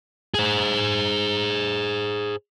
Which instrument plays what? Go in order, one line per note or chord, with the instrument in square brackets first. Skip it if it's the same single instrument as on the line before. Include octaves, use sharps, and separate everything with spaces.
[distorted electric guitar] G#4 C5